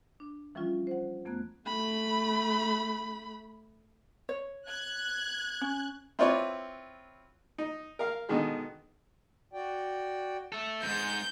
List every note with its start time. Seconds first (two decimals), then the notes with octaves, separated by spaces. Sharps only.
0.20 D4
0.55 E3 F3 G3 C#4 F4
0.87 C5 F#5
1.25 F2 A3 B3 A#5 F#6 G#6
1.67 A3 B5
4.29 C#5
4.68 F#6 G#6
5.61 C#4
6.19 C4 E4 F4 B4 C#5 D5
7.58 D#4
7.99 A#4 F5
8.29 B2 D3 D#3 G#3
9.53 F#4 D5 G5
10.52 A4 E5
10.83 F2 G#2 G#3 G6